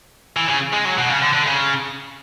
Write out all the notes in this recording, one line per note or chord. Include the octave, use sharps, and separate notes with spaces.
E3
C#3
G#3
F#3
B2
C#3
D3
D3
C#3